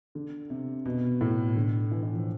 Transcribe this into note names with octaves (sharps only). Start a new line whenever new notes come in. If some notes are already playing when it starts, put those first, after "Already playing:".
D3
C3
B2
A2
D3
E3
E3
F3